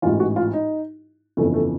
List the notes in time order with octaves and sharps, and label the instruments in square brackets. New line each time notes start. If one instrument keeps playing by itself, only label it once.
[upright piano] A1 G#2 E3 F4
F#4
F4
D#4
G1 F2 C#3 E3 A3
A3